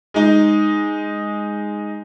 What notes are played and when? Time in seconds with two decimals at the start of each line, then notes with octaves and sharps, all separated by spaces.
0.14 G#3 D#4